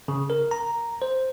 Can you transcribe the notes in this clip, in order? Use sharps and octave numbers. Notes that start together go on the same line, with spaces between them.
C#3
A#4
A#5
C5